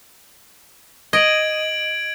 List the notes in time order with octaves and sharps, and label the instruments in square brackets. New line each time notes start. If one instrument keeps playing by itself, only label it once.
[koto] D#5 [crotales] G#6 D7 F#7